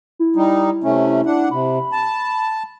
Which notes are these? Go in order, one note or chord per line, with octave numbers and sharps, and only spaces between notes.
E4
G3 D#4
C3 A3 C#4
D4 F#5
C3 B5
A5